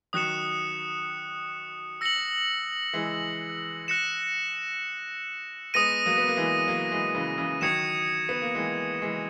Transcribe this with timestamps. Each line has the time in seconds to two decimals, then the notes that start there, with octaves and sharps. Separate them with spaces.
0.13 D#3 F#3 D#6 F#6 C#7 E7
2.01 E6 A#6 C#7 F#7
2.93 E3 G#3
3.88 F#6 A#6 C#7 E7
5.74 G#3 B3 D#6 A#6 D#7
6.06 F#3 A#3
6.18 B3
6.28 A#3
6.37 E3 G#3
6.68 F#3 A#3
6.91 E3 G#3
7.15 C#3 E3
7.37 C#3 E3
7.61 D#3 F#3 D#6 G#6 C#7 E7
8.29 B3
8.42 A#3
8.55 E3 G#3
9.02 E3 G#3